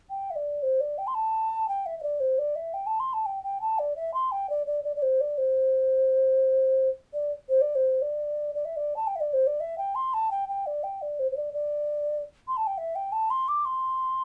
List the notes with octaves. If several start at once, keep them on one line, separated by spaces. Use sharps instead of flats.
G5
E5
D5
C5
D5
G5
C6
A5
G5
E5
E5
D5
C5
D5
E5
G5
A5
C6
A5
G5
G5
A5
D5
E5
C6
G5
D5
D5
D5
D5
C5
D5
C5
D5
C5
D5
C5
D5
D5
E5
D5
A5
G5
E5
D5
C5
D5
E5
G5
C6
A5
G5
G5
D5
G5
D5
C5
C5
D5
D5
C6
A5
G5
E5
G5
A5
C6
D6
C6